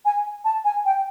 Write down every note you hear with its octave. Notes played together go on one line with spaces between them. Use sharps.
G#5
A5
G#5
G5